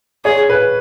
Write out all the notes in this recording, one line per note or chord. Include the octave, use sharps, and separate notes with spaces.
G#4 C#5
B4